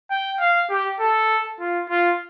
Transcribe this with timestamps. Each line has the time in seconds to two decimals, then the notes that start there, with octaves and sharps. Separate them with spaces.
0.10 G5
0.40 F5
0.69 G4
1.00 A4
1.60 F4
1.90 F4